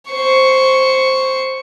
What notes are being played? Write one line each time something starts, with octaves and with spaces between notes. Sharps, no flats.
C5 C#6